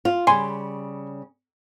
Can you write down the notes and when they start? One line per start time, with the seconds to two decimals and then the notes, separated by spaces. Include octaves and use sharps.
0.05 F4
0.27 C#3 G3 G#5 C6